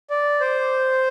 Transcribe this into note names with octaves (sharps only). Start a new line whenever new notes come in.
D5
C5